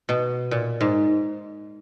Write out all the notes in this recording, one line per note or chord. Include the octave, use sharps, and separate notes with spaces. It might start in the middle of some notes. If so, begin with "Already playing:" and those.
B2
A#2
G#2